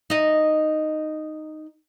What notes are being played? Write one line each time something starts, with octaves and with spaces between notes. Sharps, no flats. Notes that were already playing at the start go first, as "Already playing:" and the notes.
D#4 D#5